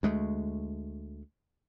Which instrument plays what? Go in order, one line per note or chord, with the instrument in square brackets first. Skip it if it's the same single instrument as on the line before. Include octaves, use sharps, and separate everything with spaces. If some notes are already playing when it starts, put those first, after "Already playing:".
[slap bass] D2 G#3 A3